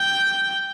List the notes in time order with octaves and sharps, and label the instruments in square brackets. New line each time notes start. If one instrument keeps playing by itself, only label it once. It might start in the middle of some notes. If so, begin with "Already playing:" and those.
Already playing: [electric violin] G5